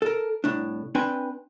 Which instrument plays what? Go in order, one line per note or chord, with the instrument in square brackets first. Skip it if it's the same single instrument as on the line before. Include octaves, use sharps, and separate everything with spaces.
[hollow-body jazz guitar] A4 A#4
C2 A2 D4
C4 D4 B4 G5 G#5